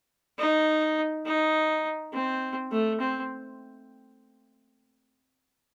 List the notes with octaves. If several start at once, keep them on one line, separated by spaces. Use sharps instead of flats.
D#4
D#4
C4
A3
C4